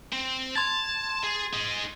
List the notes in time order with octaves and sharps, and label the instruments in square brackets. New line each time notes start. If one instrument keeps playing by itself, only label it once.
[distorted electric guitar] C4
[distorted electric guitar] A5 [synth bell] C6 G#6 A6
[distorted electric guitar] G#4
D#4 G#4